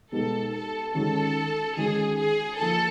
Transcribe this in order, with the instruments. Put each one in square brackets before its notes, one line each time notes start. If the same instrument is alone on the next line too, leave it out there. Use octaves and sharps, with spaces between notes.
[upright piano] B2 G#3 B3 D#4 G4 [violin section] A4
[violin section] A4
[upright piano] D#3 G#3 C#4 F#4 [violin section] A4
[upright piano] D#3 G#3 C#4 F#4 [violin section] G#4
[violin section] G#4
[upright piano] F3 A#3 D#4 [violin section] A4